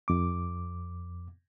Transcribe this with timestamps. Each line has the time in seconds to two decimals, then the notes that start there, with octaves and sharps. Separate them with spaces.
0.08 F2 D6